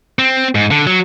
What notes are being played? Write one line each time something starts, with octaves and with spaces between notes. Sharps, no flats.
C4
G#2
D3
F#3